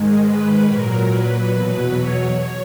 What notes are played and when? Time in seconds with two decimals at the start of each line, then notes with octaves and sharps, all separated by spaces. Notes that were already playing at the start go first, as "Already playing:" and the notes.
Already playing: G#2 D#3 G#3
0.23 B4
0.65 A#2 F#3 A#4
1.08 B4
1.50 E2 B2 F#3
1.92 C#5